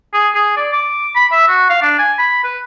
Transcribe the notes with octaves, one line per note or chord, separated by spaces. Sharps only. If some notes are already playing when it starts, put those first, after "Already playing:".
G#4
G#4
D5
D6
B5
E5
F#4
F5
D4
G#5
B5
B4